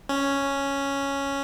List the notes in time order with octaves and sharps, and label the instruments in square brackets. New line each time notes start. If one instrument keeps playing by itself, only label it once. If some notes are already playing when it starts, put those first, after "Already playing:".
[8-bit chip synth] C#4